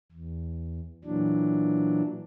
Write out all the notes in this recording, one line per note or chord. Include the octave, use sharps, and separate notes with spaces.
E2
A#2 E3 F#3 D4